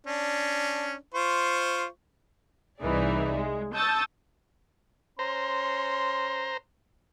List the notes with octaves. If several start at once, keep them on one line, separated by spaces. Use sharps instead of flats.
C#4 D4
F4 C5 C#6
C2 E3 D#4 G#4 D5 E5
G#3
A5 C#6 D#6 E6 G6 A6
C#4 C5 A#5 C6